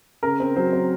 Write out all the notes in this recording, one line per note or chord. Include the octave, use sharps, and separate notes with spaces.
C#3 A#4
C4
F#3 C5
C4